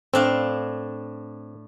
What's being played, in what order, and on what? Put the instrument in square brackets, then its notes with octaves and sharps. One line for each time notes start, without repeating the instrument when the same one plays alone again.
[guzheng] A2 D4 F5 [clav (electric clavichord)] C4